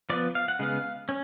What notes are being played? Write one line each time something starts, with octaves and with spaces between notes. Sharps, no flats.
F3 B3 D5
F5
F#5
C#3 G#3 B3 F5
C#4